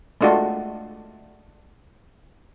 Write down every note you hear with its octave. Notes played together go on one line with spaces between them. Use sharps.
G#3 A3 D4 F4 F#4